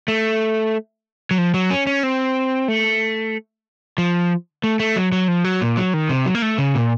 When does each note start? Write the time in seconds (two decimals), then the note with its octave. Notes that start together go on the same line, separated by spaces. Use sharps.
0.08 A3
1.31 F#3
1.38 F3
1.54 F#3
1.70 C#4
1.87 C#4
2.03 C4
2.68 A3
3.98 F3
4.64 A3
4.80 A3
4.96 F#3
5.12 F#3
5.28 F3
5.45 F#3
5.61 A#2
5.77 F#3
5.94 D#3
6.09 C3
6.26 F#3
6.35 A#3
6.42 A3
6.58 C#3
6.75 A#2